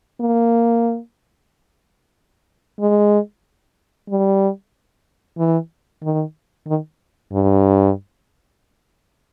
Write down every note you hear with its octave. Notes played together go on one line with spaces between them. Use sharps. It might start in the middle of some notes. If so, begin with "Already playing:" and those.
A#3
G#3
G3
E3
D#3
D#3
G2